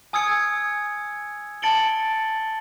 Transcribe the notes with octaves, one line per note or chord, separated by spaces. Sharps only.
G#5 D#6 E6 G#6 C#7
A5 A6 C#7 D7 F#7 G7